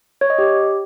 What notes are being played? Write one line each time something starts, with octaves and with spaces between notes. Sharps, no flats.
C#5
D#5
G4